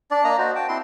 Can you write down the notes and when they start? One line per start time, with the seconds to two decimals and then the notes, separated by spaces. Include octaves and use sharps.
0.11 D4 D5
0.24 A#3 D#5 A#5
0.38 F#4 C5
0.55 G5 A5
0.68 C4 E4 C6